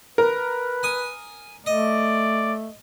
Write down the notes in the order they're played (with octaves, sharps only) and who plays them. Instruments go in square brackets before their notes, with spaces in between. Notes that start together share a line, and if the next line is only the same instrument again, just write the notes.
[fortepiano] A#4 [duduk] B4
[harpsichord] G#5 D#6
[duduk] A3 [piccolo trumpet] D5 [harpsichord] D#5